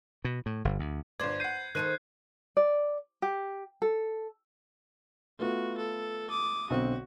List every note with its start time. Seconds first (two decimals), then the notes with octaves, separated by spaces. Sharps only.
0.25 B2
0.46 A2
0.65 G1
0.79 D2
1.20 G1 B4 C5 D5 G#6
1.40 F#5 G6 C7 D#7
1.75 D#3 D#4 A4 C5 F#6 D#7
2.57 D5
3.22 G4
3.82 A4
5.39 A3 B3 F4 F#4
5.77 A4
6.30 D6 D#6
6.70 B1 D3 C4 F#4